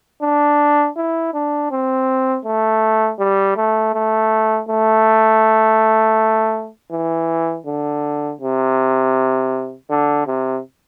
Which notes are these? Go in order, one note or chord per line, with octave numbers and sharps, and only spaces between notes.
D4
E4
D4
C4
A3
G3
A3
A3
A3
E3
D3
C3
D3
C3